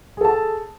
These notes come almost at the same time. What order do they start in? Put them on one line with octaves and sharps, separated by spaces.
G#4 A4 A5